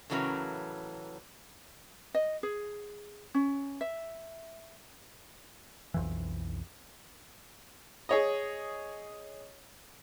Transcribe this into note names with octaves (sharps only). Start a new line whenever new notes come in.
A2 C#3 E3 F#3 C#4 A#4
D#5
G#4
C#4
E5
B1 F2 E3
G#4 C#5 D#5